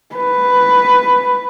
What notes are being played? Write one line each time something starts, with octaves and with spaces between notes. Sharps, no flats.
B4